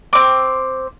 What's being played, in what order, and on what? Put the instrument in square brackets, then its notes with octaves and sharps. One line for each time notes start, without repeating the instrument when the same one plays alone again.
[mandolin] C4 D6